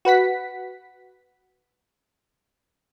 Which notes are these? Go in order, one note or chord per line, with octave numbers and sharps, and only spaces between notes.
F#4 B4 F#5 B6